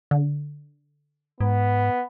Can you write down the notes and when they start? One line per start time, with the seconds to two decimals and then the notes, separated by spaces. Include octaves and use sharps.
0.11 D3
1.40 G#2 B3